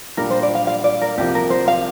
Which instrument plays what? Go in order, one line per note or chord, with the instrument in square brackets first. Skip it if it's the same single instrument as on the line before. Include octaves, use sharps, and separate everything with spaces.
[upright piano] A#2 G3 D4 G4 [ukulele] A#4
[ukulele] C5
D5
F5
F5
D5
A#4
[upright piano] C2 C3 F3 A#3 [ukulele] G4
[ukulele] A#4
C5
F5